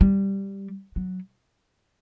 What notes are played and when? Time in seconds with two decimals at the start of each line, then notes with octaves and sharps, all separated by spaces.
0.01 G3
0.96 F#3